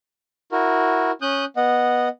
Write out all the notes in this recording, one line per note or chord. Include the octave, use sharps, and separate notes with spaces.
E4 F#4 A#4
C#4 D#6 F#6 G6
B3 D#5 F#5